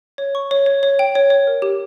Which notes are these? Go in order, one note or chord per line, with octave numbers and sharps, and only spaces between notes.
C#5
C#6
C#5
C#5
C#5
G5
C#5
C#5
A#4
G4